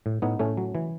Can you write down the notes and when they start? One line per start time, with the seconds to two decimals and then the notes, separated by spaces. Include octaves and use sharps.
0.06 A2
0.22 A2 B3 D#4
0.39 A2 A3 C#4
0.57 F#3
0.75 E3